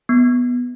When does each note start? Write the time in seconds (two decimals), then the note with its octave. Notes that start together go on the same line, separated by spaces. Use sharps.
0.09 B3